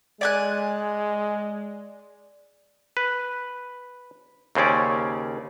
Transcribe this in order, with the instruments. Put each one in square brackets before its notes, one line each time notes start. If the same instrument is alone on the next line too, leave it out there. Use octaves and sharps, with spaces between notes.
[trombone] G#3 [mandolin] D5 G#5 F#6
[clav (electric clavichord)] B4
D#2 C#3 C4 C#4 D5